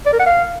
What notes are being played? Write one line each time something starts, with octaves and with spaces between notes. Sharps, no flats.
D5
A#4
F#5
F5